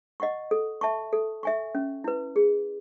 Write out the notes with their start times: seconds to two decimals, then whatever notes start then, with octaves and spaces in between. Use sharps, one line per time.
0.20 D#5 F#5 C#6
0.51 A4
0.81 E5 A5 C#6
1.13 A4
1.43 E5 G#5 C#6
1.75 C#4
2.04 E4 B4
2.36 G#4